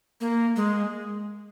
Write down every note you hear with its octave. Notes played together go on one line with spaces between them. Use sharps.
A#3
G#3